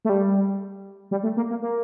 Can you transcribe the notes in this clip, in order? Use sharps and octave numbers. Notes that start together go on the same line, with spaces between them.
A3
G3
G3
A3
A#3
A#3
A#3